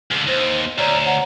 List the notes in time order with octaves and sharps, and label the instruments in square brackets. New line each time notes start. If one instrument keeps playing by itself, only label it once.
[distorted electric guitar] C#2 D3
[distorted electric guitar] D#2 [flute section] C5
[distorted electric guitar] D2 [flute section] C#5 D5 A#5
[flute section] C#5 F#5 A#5